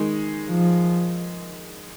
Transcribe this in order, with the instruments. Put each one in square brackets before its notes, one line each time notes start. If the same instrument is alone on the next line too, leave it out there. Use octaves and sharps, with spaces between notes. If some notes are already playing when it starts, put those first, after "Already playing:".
Already playing: [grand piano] D#3 G#3 D#4
[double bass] F3